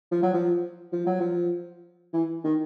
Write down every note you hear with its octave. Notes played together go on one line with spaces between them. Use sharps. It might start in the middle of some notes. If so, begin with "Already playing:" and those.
F3
F#3
F3
F3
F#3
F3
E3
D#3